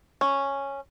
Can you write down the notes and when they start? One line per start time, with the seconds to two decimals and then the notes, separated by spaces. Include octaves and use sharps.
0.21 C#4